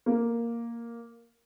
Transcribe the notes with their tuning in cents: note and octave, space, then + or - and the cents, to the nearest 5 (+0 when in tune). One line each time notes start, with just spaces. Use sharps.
A#3 +0